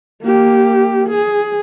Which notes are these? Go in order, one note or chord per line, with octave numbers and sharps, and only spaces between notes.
A#3 G4
G#4